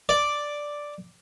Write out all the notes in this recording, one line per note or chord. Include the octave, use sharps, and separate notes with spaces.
D5